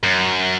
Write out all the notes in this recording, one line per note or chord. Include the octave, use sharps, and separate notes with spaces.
F#2